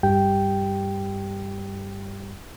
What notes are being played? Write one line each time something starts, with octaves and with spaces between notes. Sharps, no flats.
G2 G3 G4 G5